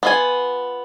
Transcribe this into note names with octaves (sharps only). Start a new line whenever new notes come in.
B3 F4 G#5